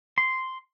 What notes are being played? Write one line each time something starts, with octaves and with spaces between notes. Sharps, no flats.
C6